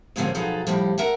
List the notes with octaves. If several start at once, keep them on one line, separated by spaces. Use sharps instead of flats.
D#2 G#2 D3 F3 C4 C#4
B2 F3 F#3 D#4 G#4 A4
A2 F3 G3
A#4 E5 F#5